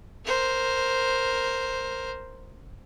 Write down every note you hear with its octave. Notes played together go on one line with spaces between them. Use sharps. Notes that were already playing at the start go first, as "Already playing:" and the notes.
A#4 C5